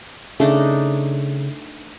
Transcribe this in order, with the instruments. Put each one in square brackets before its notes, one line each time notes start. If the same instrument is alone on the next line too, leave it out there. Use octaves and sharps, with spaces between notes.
[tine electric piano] C#3 [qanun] A3 D4 D#4